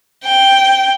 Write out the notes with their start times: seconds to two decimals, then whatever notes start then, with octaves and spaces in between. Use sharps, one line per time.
0.25 G5